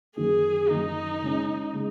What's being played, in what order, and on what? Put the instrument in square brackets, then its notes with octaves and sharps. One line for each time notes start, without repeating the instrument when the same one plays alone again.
[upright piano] F#2 D#3 A#3 [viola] G#4
[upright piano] F#2 D#3 A#3 [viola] D#4
[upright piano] C#3 G#3 C#4
C#3 G#3